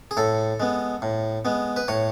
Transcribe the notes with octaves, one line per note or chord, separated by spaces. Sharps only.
G#4
A2 A4
G#3 B3
A2
G#3 B3
B4
A2 C#5